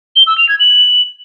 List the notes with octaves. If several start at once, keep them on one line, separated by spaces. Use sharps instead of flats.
G7
E6
F7
G#6
F#7